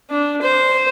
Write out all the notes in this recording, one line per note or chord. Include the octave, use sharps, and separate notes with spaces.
D4
C5